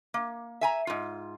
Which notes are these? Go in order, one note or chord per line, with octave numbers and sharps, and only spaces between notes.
A#3
E5 G#5 A#5
G#2 F4